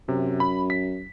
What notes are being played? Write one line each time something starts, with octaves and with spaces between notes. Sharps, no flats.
F#2 C3
B5
B6